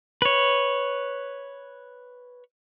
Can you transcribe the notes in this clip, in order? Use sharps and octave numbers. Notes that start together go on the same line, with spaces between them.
B4 C#5